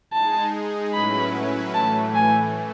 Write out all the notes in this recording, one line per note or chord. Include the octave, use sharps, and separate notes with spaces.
G#3 D#4 G#4 A5
A2 F#3 C#4 E4 B4 B5
A2 E3 A3 A5
G#5